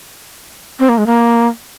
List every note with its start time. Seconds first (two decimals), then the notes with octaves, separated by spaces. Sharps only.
0.79 C4
0.89 A#3
0.98 G#3
1.06 A#3